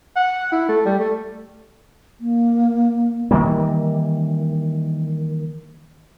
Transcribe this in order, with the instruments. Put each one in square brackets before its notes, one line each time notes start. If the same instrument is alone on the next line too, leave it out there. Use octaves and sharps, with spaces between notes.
[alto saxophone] F#5
E4
A3
G3
A3
[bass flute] A#3
[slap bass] D#3 E3 G3 A#3